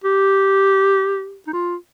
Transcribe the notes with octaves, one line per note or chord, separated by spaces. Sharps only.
G4
D#4
F4